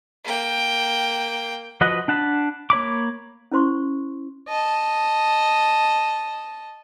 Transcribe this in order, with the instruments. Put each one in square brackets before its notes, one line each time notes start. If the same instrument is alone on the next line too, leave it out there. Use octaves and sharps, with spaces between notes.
[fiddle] A#3 G5
[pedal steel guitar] F3 F#4 B4 D#5 F#5
D4 F#5 A5 B5
A#3 C#5 B5 D6
[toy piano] C#4 E4 C5 C6 C#6
[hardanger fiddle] D#5 A5